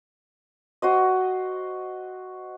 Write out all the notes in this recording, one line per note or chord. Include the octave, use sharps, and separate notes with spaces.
F#4 C5 D#5